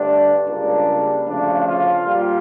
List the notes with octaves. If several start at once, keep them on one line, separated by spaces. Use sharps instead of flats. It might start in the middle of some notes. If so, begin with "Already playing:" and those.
Already playing: G2 D3 A3 D4
C#2 C#3 G3 A#3 D4
D2 C#3 F3 A3 D4
F4
A#2 G3 A#3 F4